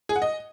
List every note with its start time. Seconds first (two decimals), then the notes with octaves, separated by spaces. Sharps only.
0.09 G#4
0.15 F#5
0.22 D#5